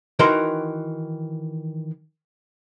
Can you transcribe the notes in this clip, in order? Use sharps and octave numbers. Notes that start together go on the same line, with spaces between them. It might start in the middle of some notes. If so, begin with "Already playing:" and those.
D#3 E3 F#4 A#4 A#5 C6